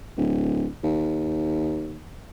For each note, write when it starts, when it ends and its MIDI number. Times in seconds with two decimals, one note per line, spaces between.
0.17 0.66 26
0.83 2.03 39